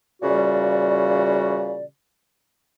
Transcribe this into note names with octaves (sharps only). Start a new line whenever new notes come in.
A#2 C#3 E3 G3 F#4 D5